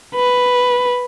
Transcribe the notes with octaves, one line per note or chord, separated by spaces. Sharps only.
B4